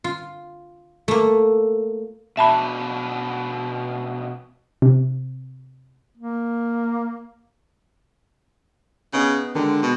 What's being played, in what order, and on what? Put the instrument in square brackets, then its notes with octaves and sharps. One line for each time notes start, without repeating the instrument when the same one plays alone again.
[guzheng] F4
A3 A#3
[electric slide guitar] B2 D4 [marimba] E5 A5 B5
[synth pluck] C3
[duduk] A#3
[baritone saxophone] C#3 [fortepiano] B3 D#4 G#4
[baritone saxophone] D3 [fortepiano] D#3 G#3
[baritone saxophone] B2